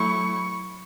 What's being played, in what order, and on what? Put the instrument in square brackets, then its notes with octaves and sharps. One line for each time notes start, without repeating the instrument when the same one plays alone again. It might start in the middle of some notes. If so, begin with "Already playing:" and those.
Already playing: [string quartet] F#3 A3 E4 C#6